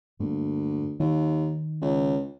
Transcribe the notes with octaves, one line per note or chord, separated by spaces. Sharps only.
D2 G2 A#3
D#2 D#3
C#2